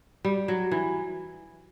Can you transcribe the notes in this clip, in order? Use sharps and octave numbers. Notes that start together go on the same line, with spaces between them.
G3
F#3
E3